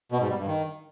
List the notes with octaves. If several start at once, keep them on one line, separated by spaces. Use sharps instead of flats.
B2
G#2
G3
G2
D#3